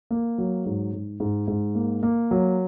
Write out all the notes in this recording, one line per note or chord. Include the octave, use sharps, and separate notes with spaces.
A#3
F#3
G#2
G#2
G#2
G#2
A#3
A#3
F#3